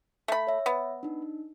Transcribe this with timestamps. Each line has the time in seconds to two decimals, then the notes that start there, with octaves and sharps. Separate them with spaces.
0.28 A3 B5
0.47 C#5 E5
0.66 B3
1.03 D4 D#4